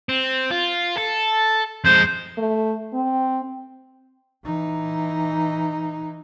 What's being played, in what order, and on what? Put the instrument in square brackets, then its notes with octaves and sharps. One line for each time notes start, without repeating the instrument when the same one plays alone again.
[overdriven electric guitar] C4
F4
A4
[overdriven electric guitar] F2 G#3 [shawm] C5
[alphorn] A3
C4
[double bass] E3 D#4